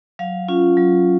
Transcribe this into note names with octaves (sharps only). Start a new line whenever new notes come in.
F#3 F5
C#4 F4
F#3